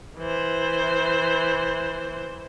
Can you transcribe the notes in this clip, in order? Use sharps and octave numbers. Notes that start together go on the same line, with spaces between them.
E3 C5